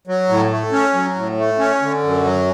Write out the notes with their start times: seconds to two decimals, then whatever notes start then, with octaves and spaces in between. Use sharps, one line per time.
0.07 F#3
0.29 A2
0.51 A3
0.72 C#4
0.94 F#3
1.16 A2
1.37 A3
1.59 C#4
1.81 D3
2.03 F#2
2.24 F#3